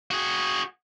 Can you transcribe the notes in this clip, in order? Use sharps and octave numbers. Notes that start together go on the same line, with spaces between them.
F#4 G#4